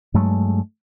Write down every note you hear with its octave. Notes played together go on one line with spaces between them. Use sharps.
G2 F#3 G#3 A3